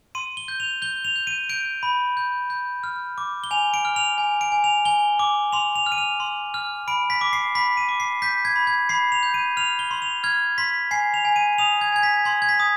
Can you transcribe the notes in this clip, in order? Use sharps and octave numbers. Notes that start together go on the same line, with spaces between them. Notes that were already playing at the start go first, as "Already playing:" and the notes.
C6 D#7
G7
G6
F7
G6 G7
F7
G6
D#7
G6 D7
B5
G6
G6
F6
D6
G7
G#5 F7
D7
F6
F7
G#5
D7
G#5
F7
G#5 G7
D6
C6 F7
F7
F6
D#7
F7
C6
F6
B5 D7
B6
D6
C7
B5 B6
D#7
D6
C7
G6 B6
G#6
B5
G#6
B5 C7
F7
G6
D#7
F6 F7
G7
C6
F7
F6 G#6
C6 B6
G#5 C7
F7
G#5
D#7
D#6 F7
G#6
G#5 G#6
B6
C6 G#6
G#6
B6
D#6